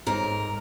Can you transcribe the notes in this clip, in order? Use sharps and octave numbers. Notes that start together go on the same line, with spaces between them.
G#2 A#4